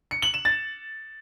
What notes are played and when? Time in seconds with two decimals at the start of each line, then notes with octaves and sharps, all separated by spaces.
0.11 C#7
0.22 F#7
0.34 E7
0.45 A6